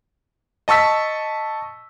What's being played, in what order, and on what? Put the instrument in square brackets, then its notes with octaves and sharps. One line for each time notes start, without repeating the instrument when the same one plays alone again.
[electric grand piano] D#5 A5 C#6 E6 B6